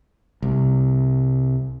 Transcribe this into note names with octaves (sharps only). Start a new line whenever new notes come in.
C2